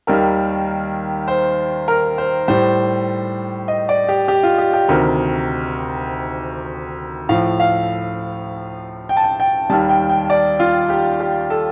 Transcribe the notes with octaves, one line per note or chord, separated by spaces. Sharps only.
D#2 D#3 G3 A#4
C5
A#4
C5
A2 G3 C5
D#5
D5
G4
G4
F4
G4
G4
D2 C3 D#3 A#4
A2 F3 F5
F5
G5
A5
G5
G5
D#2 D#3 G3 A5
G5
G5
D5
F4
G4
G4
A4